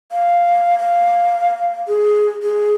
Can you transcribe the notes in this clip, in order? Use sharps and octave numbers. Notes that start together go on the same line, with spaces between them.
F5
F5
G#4
G#4